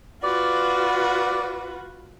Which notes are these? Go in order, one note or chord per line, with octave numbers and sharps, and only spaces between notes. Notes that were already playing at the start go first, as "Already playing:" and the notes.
F4 F#4 B4 D5